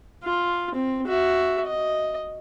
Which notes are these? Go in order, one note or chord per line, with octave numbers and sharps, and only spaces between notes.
F4
C4
F#4 E5
D#5